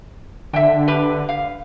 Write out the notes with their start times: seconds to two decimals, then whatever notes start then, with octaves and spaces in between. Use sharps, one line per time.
0.53 D3 E5 G5
0.88 G4 B4
1.29 F5